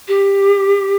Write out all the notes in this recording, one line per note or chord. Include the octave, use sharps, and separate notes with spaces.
G4